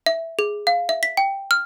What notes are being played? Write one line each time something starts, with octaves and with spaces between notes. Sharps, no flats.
E5
G#4
F5
E5
B6
G5
F6